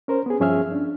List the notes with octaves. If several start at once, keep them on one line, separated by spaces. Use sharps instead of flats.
C#4 A#4 C5
B3 G#4
G2 F3 C#4 G#4 E5 F6
D4